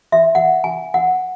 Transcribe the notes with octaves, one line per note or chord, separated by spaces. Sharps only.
E5
F#5
G#5
F#5